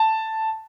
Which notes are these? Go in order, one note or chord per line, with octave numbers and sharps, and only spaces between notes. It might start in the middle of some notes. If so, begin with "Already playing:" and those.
Already playing: A5